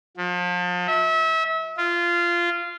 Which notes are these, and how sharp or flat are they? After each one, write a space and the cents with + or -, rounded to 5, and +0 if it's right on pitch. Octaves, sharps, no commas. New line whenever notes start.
F3 +35
E5 -30
F4 -15